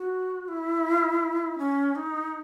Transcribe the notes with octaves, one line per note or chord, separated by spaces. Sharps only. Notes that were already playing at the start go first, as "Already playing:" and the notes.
Already playing: F#4
E4
C#4
D#4